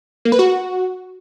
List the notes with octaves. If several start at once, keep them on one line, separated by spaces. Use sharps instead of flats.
A#3
B4
F#4